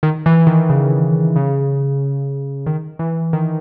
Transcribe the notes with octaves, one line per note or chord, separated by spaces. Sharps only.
D#3
E3
D#3
C#3
C#3
D#3
E3
D#3